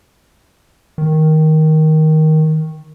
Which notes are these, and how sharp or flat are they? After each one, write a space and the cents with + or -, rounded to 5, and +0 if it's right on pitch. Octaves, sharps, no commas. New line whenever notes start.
D#3 +10